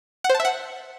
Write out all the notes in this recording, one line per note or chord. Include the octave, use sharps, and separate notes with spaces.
F#5
C5
A5
E5
F#5